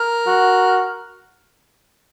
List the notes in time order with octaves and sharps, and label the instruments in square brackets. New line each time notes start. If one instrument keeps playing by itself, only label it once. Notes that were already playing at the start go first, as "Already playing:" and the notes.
Already playing: [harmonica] A#4
[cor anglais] F#4